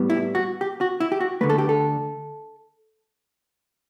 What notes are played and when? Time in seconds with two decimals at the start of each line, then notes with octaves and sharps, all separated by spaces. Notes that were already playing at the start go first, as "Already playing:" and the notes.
Already playing: A2 G3 B3
0.10 E4
0.35 F#4
0.61 G4
0.81 F#4
1.00 E4
1.12 G4
1.20 F#4
1.41 D2 D3 F#3 A3 B4
1.50 A4
1.58 G4
1.69 A4